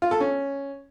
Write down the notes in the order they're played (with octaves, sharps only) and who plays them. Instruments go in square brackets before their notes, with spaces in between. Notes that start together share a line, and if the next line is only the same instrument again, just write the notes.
[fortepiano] F4
A4
C#4